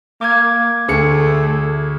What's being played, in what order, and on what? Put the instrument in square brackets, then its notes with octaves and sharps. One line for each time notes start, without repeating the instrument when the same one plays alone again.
[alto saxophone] A#3 [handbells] D6 G#6
[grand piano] D2 G#4 C#7 [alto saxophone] A3